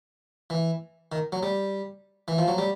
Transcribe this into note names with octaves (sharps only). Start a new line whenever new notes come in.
E3
D#3
F#3
G3
E3
F3
F#3
G3